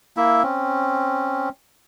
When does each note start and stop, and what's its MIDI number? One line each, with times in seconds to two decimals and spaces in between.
0.17 0.43 58
0.17 0.43 64
0.17 0.43 76
0.43 1.49 60
0.43 1.49 61